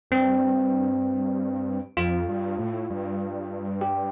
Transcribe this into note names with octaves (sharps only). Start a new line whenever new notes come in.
G2 C4
F2 F4
G2
A2
G2
G4